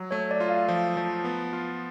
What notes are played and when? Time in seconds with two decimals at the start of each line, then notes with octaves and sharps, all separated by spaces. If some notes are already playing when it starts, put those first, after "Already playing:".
Already playing: F#3
0.11 A3 C#5
0.31 D5
0.40 F4
0.49 F5
0.68 F3
0.97 F3
1.24 B3
1.53 F4